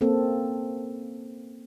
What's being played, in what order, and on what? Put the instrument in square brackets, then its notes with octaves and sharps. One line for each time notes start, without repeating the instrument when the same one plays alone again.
[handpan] A#3 C4 C#4 A4